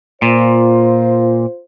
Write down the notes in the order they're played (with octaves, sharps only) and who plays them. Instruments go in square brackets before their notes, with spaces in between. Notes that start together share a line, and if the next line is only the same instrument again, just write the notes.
[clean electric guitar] A#2 [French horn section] F4 C5